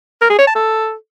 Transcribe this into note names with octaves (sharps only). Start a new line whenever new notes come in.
A#4
G#4
C#5
A5
A4